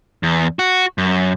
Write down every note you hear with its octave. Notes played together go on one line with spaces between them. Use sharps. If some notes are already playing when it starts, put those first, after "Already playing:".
E2
F#4
F#2